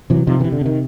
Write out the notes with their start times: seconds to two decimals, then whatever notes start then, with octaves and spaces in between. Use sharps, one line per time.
0.10 C3 E3 F#3
0.27 C3 D#3 F3
0.40 D3 E3
0.44 C3
0.52 D3
0.61 C3 D#3